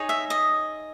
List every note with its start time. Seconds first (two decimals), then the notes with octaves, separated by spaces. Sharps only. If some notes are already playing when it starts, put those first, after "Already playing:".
Already playing: D#4 G#4 C#5
0.09 E5
0.30 D#5